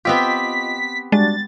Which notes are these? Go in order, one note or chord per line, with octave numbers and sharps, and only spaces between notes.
B3 C4 F4 G4 D#5 B6
G3 G#3 D4 F#4 A6